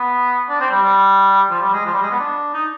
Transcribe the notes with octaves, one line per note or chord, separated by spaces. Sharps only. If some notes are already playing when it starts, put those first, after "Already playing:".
Already playing: B3
D4
C4
G3
G3
F3
G3
G#3
F3
G3
G#3
B3
D4
D#4